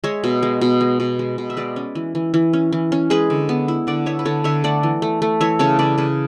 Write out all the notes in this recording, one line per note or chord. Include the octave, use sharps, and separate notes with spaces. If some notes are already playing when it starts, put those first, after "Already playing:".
G#3 C#5 E5
B2
G#3
B2
G#3
B2
G#3
B2
E5
G#3 B4 D5
C#4
E3
E3
E3
C#4
E3
C#4
G#3 G#4 B4
D3
B3
E4
D3 D5 F#5
B3 C#5 E5
B4
D3 A4 C#5
D3 C#5 E5
A3 D5 F#5
E3
A3
A3
E3 C#5 E5
C#3 A4 C#5
C#3 B4 D5
C#3 G#4 B4